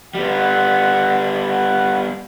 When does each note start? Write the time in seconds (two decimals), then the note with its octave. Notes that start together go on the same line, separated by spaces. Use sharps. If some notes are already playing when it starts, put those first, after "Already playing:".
0.15 G3 B3 F#5
1.46 F#5